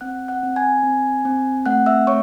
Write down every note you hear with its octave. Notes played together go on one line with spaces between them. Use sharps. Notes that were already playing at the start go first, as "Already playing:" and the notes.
C4 F#5 F#6
F#5 F#6
C4
G#5 G#6
C4
C4
A3 F#5 F#6
E5 E6
A3 C#5 C#6